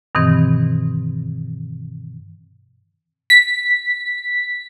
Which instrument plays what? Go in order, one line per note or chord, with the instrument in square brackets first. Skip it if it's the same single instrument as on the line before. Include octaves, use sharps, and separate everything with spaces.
[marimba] G2 B2 D#3 E3 C4
[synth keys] B6